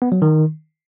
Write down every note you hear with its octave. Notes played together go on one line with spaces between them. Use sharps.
B3
F#3
D#3